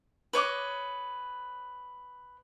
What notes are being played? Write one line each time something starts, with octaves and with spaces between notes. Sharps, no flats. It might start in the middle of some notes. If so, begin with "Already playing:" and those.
B4 C#5 D#5 D6